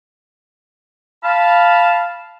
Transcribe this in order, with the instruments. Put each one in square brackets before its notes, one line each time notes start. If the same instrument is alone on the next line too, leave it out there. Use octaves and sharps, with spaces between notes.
[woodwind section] F5 A5 B5